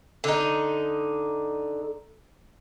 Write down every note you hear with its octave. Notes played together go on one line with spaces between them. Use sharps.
D3 D#4